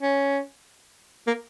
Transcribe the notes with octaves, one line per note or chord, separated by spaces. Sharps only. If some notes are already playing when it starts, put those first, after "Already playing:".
C#4
A#3